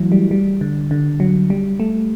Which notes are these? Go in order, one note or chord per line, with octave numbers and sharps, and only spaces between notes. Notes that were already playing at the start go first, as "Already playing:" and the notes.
Already playing: E3 F#3 A3 E4 F#4
G3
G3
D3
D3
F#3
G3
A3